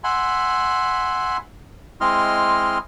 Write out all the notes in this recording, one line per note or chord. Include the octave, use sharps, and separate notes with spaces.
E5 F#5 G#5 B5 C6
G#3 C4 E4 D#5 C6 F6